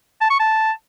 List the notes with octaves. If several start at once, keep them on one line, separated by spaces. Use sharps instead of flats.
A5
C#6
A5